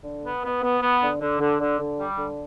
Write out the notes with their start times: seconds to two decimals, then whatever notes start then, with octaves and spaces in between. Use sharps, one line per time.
0.04 D3
0.24 B3
0.44 B3
0.63 B3
0.82 B3
1.02 D3
1.21 D3
1.40 D3
1.60 D3
1.79 D3
1.99 G3
2.18 D3